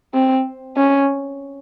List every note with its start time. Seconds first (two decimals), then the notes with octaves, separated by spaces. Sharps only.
0.14 C4
0.76 C#4